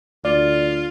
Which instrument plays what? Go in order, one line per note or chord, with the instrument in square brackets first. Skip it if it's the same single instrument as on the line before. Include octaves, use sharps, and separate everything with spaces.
[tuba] D2 [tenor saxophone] F4 [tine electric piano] D5